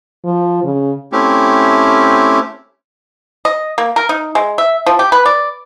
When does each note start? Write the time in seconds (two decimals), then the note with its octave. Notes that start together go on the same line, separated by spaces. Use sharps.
0.25 F3
0.64 C#3
1.12 A3 C4 C#4 E4 G4
3.45 D#5
3.78 A#3
3.96 A#4
4.09 D#4
4.35 G#3
4.58 E5
4.86 F3
4.99 G4
5.12 B4
5.26 D5